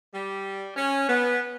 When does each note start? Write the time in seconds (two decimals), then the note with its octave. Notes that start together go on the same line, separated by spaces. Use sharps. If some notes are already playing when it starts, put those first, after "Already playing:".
0.13 G3
0.75 C#4
1.08 B3